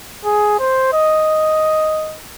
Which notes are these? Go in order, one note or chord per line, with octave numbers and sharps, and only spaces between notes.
G#4
C5
D#5